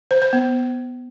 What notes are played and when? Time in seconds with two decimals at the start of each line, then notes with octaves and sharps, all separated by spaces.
0.11 C5
0.22 C5
0.33 B3